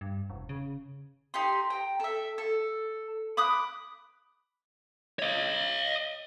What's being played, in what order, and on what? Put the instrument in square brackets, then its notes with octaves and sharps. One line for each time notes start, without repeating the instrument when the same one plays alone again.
[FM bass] G2
E1
C#3
[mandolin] D#4 G4 C6
G5 A#5
A4 E5
A4
B5 D6 D#6 F#6
[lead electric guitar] C#5 D#5